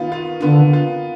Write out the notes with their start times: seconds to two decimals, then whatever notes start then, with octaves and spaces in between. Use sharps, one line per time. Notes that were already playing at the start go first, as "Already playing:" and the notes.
Already playing: D#3 B3 F4
0.12 F4
0.42 D3 B3
0.73 F4